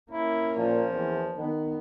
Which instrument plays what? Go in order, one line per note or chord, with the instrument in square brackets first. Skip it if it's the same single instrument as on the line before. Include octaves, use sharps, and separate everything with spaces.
[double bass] A#3 C#4 [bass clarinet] E4
[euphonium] A#2 [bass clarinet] F3
[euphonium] E2
[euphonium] D#3 [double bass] B3